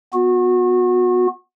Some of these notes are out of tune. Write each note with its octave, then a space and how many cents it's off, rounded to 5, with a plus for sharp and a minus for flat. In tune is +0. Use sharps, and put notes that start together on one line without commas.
B3 +0 F#4 -30